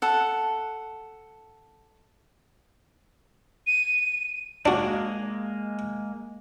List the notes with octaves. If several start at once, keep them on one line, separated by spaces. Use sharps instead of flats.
A4 F#5
D#7
G#3 A#3 D4 F#4